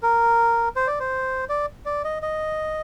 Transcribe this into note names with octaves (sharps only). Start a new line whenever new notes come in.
A#4
C5
D5
C5
D5
D5
D#5
D#5